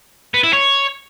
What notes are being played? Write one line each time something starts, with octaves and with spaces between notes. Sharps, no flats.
B3
E4
C#5